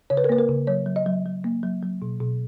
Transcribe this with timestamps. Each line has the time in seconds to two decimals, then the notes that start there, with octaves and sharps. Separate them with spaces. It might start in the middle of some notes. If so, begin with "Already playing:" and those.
0.10 C#3 C#5
0.17 B4
0.24 A#4
0.29 A#3 B4
0.39 A#4
0.49 C#3
0.67 F#3 C#5
0.86 F#3
0.96 D#5
1.06 F#3
1.25 F#3
1.44 A#3
1.63 F#3
1.82 F#3
2.02 B2
2.21 B2